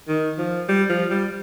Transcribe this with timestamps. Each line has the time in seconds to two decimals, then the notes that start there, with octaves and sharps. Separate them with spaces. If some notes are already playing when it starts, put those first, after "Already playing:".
0.08 D#3
0.38 F3
0.69 G3
0.89 F3
1.11 G3